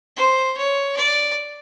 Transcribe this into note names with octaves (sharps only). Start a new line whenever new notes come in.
C5
C#5
D5